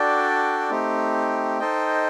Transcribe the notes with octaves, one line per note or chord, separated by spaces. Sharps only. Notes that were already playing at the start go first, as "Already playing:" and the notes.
Already playing: D4 F#4 A4 D5 G5
A3 C4 D#4 G4
D#4 A4 C5 D#5 G5